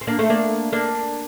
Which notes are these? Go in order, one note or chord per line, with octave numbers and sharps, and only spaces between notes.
C4
A#3 D4
A3 C4
A#3 D4
A#3 D4